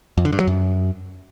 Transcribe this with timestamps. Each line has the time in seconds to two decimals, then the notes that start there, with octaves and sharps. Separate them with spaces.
0.17 F2
0.25 D3
0.32 G2
0.40 F#3
0.47 F#2